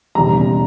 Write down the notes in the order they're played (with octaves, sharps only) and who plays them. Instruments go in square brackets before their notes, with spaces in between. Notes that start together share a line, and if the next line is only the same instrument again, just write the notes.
[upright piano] E1 D#2 C#3 G3 A#5